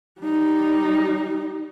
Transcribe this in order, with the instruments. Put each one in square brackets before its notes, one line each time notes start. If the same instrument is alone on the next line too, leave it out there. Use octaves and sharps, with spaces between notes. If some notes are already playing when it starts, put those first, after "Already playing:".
[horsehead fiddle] G3 D#4